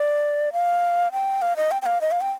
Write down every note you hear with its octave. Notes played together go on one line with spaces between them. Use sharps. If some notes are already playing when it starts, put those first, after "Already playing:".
Already playing: D5
F5
G5
F5
D#5
G5
G5
F5
D#5
F5
G5